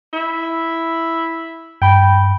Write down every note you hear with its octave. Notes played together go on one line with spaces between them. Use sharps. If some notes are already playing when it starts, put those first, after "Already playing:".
E4
G2 G5 B5